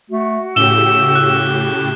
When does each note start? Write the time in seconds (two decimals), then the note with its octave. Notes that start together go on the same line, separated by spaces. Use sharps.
0.10 A3 F#4
0.56 A2 C#3 G4 E6 E7 G7
1.15 F#6